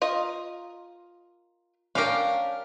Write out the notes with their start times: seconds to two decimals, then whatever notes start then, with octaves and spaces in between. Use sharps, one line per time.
0.02 F4 A#4 D#5
1.95 C#4 D4 G4 A#4 F5